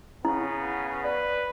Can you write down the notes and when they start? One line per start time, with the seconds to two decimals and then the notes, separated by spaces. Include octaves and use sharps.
0.25 C#3 B3 E4
1.04 B4 D5